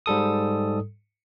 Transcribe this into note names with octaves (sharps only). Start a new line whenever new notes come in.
G#2 G3 A4 D#6